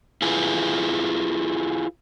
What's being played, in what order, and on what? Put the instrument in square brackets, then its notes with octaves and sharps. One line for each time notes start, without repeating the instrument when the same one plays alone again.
[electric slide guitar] E4 F4 G#4 B4